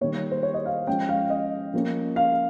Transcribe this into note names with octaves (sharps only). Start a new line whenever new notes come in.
D#3 G3 A#3 C#5
C5
C#5
D#5
F5
F3 G#3 C#4 G5
F5
D#5
F3 A#3 C#4
F5